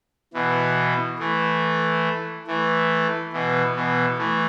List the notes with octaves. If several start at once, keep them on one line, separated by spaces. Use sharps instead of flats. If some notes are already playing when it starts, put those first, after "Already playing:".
B2 E3
E3 A3
E3 A3
B2 E3
B2 E3
E3 A3